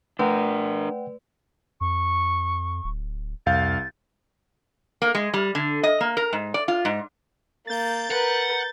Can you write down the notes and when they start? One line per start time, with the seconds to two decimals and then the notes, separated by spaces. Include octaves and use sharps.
0.19 A3 D4 A#4 B4 D5 F#5 G5
1.81 F2 C#6
2.84 D1
3.46 C2 F2 F5 G6 A6
5.02 A#3
5.15 G#3
5.34 G3
5.55 D3
5.83 D#5
6.01 A#3
6.17 A#4
6.33 G#2
6.54 D5
6.68 F4
6.85 G#2
7.67 A#3 G6 A6
8.12 A#4 B4 F#5